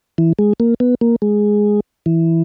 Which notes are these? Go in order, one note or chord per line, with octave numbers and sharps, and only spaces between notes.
E3
G#3
A#3
B3
A#3
G#3
E3